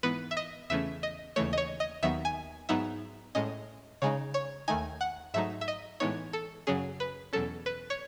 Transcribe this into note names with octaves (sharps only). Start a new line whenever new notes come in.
G#2 E3 B3 B4
E5
D#5
E2 C#3 E3 A3 C#4 E5
D#5
D#2 C#3 E3 A3 C#5
D#5
C#5
D#5
D#2 D#3 F#3 B3 E5
G#5
G#2 F#3 B3 D#4 E5
A2 G#3 C#4 D#5
C#3 G#3 D#4 C#5
C#5
D#2 D#3 A3 D#4 G#5
F#5
G#2 F#3 A3 D#4 E5
E5
D#5
A2 E3 G#3 B3 D#4 C#5
A4
F#2 C#3 F#3 C#4 G#4
B4
E2 B2 F#3 C#4 A4
B4
C#5